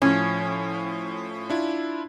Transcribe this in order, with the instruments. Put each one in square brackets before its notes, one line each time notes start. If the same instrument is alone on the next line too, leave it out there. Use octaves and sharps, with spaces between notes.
[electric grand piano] A2 F3 [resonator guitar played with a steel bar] C#4
[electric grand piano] D4 E4 F4